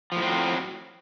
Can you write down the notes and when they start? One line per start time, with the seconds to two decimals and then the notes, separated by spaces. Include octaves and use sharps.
0.12 F3
0.16 A2
0.21 C4
0.25 F#3